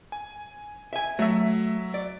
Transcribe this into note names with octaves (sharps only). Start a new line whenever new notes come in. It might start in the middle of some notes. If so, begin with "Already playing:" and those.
G#5
E5 G#5
F#3 A3 E5
D5